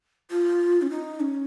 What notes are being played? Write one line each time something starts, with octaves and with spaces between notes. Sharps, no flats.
F4
C#4
D#4
C#4